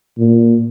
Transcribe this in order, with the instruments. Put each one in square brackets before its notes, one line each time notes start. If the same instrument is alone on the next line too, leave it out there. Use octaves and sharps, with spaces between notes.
[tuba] A#2